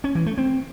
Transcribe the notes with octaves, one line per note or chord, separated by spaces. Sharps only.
C#4
E3
A3
C4